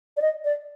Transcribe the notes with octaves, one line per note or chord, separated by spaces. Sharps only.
D5
D#5
D5